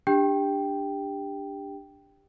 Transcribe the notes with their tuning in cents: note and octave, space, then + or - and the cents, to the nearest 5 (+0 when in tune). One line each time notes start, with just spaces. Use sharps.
D4 +0 G4 +15 G5 +0